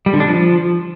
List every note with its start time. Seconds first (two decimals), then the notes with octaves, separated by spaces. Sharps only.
0.06 G3
0.13 D3
0.20 D4
0.27 F3